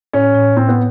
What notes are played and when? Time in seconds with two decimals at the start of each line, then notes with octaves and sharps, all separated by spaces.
0.13 A2 C#4
0.34 A2
0.56 A2 C4
0.68 B3